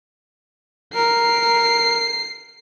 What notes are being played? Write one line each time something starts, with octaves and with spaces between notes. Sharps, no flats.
A#4 C7